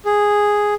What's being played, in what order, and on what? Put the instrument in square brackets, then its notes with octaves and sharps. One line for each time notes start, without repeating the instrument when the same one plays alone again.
[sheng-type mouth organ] G#4